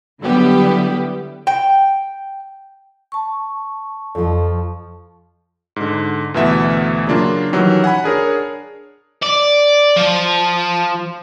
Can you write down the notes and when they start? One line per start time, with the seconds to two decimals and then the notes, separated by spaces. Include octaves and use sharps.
0.21 D3 F#3 G3 B3 E4 G4
1.47 G5
3.12 A5 C#6
4.15 F2 F3
5.76 G#2 D3
6.34 D2 G2 B2 E3 E5
7.07 C#3 F#3 A#3 D4 F4
7.52 D#3 E3 F#3 G3 C#4 E4
7.84 F#5 G#5 B5
8.04 D4 G#4 A#4 C#5
9.23 D5
9.96 F3